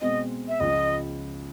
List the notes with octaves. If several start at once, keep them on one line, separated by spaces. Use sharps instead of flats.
B2 G#3 C4 D#5
E5
C#2 C#3 F3 D#5